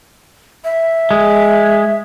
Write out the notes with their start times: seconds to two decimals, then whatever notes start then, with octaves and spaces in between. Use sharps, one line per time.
0.64 E5
1.11 G#3